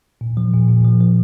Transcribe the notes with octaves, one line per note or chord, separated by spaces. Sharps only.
A#2
F3
A#2
A#2
F3
F3